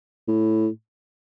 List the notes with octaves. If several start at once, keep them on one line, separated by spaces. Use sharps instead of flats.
A2